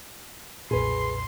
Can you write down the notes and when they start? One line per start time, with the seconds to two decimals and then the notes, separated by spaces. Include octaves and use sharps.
0.71 B1 F2 A#2 G#4 B4 C6